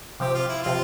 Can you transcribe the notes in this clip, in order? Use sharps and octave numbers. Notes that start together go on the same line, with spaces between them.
C3 F3 C4 G4
F4
E4
C3 F3 C4 F4